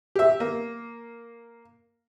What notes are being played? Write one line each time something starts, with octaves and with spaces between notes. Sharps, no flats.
G4 E5
A#3